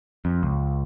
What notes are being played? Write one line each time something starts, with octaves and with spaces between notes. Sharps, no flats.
F2
C#2